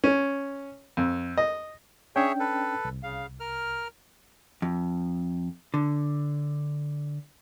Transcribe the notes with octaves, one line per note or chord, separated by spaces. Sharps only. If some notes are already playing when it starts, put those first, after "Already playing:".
C#4
F2
D#5
C#4 D4 G#4 C#5 E5 G5
A4 B4
C2
C#3 F5
A#4 F6
F2
D3